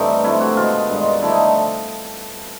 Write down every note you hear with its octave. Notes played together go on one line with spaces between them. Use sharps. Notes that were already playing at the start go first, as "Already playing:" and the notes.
Already playing: G2 E3 A3 C4 D#4
C3 F3 A3 E4
F#4
B2 G#3 B3 F4
G2 D#3 G#3
D3 F3 A3 E4
D#4